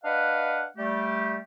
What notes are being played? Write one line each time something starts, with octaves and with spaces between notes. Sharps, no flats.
D4 B4 D#5 F5 F#5
G3 A3 G4